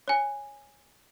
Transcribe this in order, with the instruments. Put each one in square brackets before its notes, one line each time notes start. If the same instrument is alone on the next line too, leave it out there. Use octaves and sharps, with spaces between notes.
[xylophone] C#5 G#5